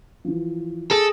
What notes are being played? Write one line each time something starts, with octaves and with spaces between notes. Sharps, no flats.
E3 F3
G#4 A4 A5